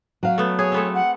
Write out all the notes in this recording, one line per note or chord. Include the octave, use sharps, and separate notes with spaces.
F#3 F5
A3 B3
G#4 C#5
A3 B3 C4
F#5